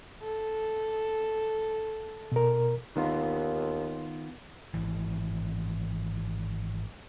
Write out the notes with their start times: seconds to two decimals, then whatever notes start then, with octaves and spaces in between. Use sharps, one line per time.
0.23 A4
2.32 B2 A#4
2.96 D#2 D#3 B3 F4
4.74 G#1 E3